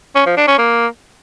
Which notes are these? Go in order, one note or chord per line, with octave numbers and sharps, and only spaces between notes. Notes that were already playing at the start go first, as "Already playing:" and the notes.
C#4
F3
D4
C#4
A#3